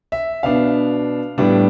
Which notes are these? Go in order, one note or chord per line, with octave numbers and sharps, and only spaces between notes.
E5
B2 B3 D4 F5
A2 G3 B3 D4